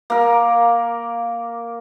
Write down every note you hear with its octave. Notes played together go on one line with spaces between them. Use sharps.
A#3 A#4